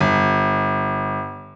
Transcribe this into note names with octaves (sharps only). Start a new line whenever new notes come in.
G1